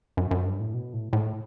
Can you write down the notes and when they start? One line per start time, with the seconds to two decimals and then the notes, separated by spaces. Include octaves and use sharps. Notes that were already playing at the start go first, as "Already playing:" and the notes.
0.17 F#2
0.31 F#2
0.46 G2
0.60 A2
0.74 B2
0.93 A2
1.13 A2